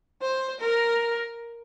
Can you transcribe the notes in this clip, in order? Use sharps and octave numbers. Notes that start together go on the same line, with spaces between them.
C5
A#4